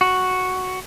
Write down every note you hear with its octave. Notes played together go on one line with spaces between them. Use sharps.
F#4